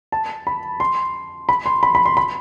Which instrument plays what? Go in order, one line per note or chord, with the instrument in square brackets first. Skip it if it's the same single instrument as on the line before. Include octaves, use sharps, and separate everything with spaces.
[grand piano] A5
B5
C6
B5
C6
B5
B5
C6
B5